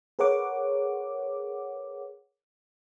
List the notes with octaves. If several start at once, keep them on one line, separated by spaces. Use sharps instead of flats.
G#4 A#4 B4 C#5 F#5 D6